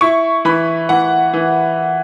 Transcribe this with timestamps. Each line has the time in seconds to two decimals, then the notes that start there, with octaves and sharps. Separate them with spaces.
0.01 E4 C#6
0.45 E3 B5
0.89 E3 F#5
1.33 E3